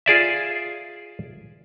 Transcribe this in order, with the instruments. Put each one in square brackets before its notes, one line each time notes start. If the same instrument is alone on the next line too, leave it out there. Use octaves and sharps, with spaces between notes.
[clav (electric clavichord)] F4 G#4 D5 E5